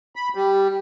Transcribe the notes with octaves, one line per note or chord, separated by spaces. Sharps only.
B5
G3